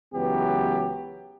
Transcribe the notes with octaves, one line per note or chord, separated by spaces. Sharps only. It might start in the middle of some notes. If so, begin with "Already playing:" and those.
C#2 E3 F#3 B3 G4